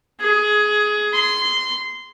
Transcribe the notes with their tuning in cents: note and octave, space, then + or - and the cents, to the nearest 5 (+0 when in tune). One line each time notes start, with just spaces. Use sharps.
G#4 +20
C6 -15